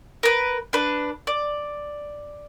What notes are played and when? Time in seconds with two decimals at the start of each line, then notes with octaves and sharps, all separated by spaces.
0.23 A#4 B4
0.73 D4 B4
1.27 D5